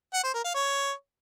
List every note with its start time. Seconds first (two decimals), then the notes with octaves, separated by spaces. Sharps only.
0.14 F#5
0.24 C5
0.34 A#4
0.44 F5
0.54 C#5